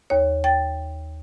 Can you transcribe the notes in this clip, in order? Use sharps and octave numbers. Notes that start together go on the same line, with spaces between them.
D#2 C#5
G5 A6